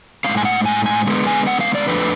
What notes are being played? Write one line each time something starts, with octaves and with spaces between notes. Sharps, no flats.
A2 G#3 C#4 F5
G#5
F#5
G#5
G#5
D3 G#3 B3
G#5
F#5
F5
D5
F2 F3 A3 D4 B4